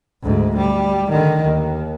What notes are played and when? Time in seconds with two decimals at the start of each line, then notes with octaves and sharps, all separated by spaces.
0.23 D2 G#2
0.57 G3
1.11 D3 D#3
1.44 D#2